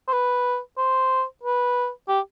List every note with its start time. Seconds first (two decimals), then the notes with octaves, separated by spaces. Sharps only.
0.07 C5
0.12 B4
0.77 C5
1.43 B4
2.08 G4